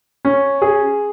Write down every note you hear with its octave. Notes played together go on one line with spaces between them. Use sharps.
C#4
G#4